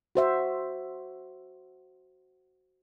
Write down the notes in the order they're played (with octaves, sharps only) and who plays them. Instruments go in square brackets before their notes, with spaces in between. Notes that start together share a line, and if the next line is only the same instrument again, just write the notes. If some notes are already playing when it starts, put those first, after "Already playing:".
[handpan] F#4 C5 E5